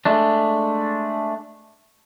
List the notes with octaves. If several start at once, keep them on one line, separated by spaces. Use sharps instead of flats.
G#3 A3 D4